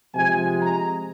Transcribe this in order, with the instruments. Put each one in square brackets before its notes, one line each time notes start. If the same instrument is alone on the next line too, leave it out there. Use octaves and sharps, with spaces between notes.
[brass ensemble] C3 F3 G#3 G#5
A#5